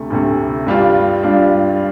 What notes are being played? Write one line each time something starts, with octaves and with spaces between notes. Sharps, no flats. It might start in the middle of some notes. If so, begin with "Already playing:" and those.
Already playing: D2 C3 A3
D2 C3 A3
G2 G3 D4 F4
G2 G3 D4 F4